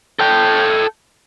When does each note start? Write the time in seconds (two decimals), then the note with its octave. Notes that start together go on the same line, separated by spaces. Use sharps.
0.19 A4 G5